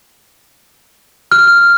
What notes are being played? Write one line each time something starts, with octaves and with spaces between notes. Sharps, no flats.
F6